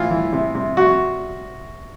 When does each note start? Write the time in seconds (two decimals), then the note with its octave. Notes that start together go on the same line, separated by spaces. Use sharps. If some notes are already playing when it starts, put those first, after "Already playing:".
Already playing: A2 E3 F4
0.11 E3
0.33 C3
0.55 C3
0.77 C3 F#4